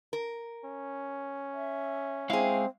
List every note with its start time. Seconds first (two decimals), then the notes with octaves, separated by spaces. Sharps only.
0.13 A#4
0.64 C#4
1.53 E5
2.30 G#3 C4 E4 G#4 F5